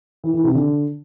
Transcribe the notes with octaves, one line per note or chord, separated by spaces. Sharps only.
E3
E3
C3
D3